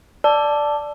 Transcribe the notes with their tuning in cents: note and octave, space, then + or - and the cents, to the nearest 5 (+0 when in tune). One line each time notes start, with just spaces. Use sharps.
D5 +0 A5 -5 E6 +15